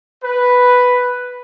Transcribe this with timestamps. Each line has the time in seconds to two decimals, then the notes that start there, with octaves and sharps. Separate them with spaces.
0.24 B4